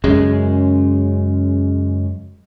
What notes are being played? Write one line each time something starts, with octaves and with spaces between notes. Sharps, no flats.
F#2 C#3 G#3